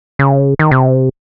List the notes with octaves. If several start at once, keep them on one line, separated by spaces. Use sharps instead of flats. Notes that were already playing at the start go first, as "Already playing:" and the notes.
C#3
D#3
C3